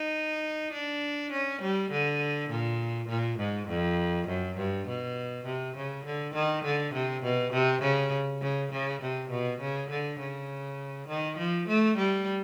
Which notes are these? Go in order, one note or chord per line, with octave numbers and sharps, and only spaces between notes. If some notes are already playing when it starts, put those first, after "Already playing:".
Already playing: D#4
D4
C#4
G3
D3
A#2
A#2
G#2
F2
F#2
G2
B2
C3
C#3
D3
D#3
D3
C3
B2
C3
C#3
C#3
C#3
C3
B2
C#3
D3
C#3
D#3
F3
A3
G3